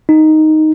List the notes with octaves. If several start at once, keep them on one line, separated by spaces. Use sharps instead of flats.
D#4